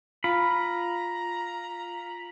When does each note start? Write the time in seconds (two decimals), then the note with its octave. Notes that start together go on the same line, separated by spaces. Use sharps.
0.24 F4 A#5 B5